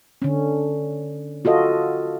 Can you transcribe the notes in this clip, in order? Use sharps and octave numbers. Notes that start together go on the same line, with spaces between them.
D3 C#4
F4 F#4 A4 D#5